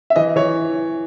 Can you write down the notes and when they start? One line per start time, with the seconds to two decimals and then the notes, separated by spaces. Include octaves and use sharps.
0.10 E5
0.16 E3 D#5
0.36 E3 C#5